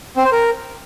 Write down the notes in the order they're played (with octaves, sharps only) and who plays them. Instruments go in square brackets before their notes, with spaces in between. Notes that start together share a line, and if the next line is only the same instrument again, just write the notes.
[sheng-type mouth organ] C4
C5
A#4